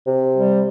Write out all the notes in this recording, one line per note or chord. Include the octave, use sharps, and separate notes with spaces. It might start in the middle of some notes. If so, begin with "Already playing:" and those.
C3
G3